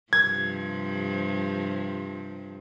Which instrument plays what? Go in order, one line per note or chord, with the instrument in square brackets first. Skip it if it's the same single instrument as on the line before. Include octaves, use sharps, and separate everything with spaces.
[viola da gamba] G2 C3 F3 [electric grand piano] G#6